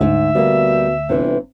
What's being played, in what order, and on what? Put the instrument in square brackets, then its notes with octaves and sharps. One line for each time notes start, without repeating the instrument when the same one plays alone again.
[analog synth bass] D2 [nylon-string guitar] G#2 [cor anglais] E5
[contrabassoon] B2 [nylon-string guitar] G3 A3 A#3
[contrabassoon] G1 [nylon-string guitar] C3 E3